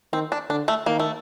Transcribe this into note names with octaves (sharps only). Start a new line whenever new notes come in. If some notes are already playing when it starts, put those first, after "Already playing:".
D#3 C4
D4
D3 D4
A3
D#3 A#3
A3